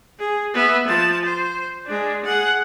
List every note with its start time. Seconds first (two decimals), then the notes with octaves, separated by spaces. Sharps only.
0.19 G#4
0.54 B3 E5
0.88 F3 A5
1.25 C5
1.86 G#3 D4
2.25 G#4 F#5